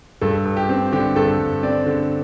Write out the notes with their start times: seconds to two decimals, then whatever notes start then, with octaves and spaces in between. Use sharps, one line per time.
0.21 G2 A4
0.45 G2
0.57 G4
0.69 C4
0.92 D3 G4
1.16 G2 A4
1.39 G2
1.63 C4 D5
1.86 D3